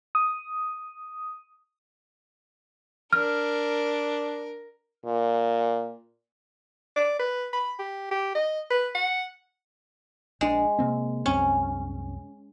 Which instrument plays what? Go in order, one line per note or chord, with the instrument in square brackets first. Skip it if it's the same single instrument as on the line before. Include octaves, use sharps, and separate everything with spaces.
[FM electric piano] D#6
[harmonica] D4 [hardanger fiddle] A#4 [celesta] F6
[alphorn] A#2
[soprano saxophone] D5
B4
B5
G4
G4
D#5
B4
F#5
[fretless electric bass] A#1 D4 [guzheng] G#3
[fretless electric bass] C3 A#3 C4
[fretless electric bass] C2 F#2 C4 [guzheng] C#4